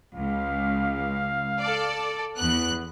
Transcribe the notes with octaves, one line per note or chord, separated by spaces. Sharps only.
C#2 F5
A4 D5
E2 B3 F#6